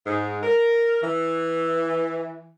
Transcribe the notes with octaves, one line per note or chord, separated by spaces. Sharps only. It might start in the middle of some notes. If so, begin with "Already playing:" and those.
G#2
A#4
E3